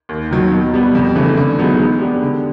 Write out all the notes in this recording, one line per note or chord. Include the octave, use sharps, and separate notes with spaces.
D#2
D#3 F#3
B2
G3 B3
F2
C#3 E3 A3
D3
F#3 B3 D#4 G#4
G#3
B3 D4 G4
D3